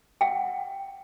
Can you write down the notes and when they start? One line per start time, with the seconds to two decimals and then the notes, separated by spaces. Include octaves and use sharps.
0.21 F#5 G5